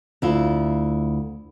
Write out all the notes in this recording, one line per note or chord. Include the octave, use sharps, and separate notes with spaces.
D2 E4 F4